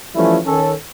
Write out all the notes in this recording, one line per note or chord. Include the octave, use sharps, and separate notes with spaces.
E3 F3 G3 A3 C#4 E4
D#3 C#4 A4